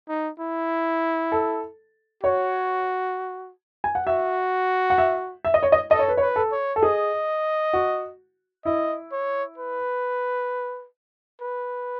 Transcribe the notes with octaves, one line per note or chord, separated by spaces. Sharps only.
D#4
E4
A4
F#4 C#5
G#5
F#5
F#4 E5
F#5
E5
E5
D#5
C#5
D#5
A4 D#5
C#5
B4
C#5
B4
A4
C#5
A4
G#4 D#5
F#4
E4 D#5
C#5
B4
B4